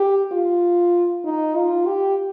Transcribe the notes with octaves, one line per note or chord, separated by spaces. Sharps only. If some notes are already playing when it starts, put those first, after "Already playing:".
Already playing: G4
F4
D#4
F4
G4